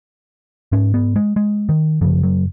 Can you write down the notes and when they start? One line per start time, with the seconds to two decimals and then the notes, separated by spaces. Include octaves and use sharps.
0.72 G#2 C#4
0.94 B3
1.16 G#3
1.36 G#3
1.69 D#3
2.01 F#2 C#3 F3
2.23 F#3